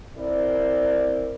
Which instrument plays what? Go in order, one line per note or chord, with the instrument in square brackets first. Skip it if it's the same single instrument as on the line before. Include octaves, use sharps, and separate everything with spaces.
[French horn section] C4 E4 A#4 D5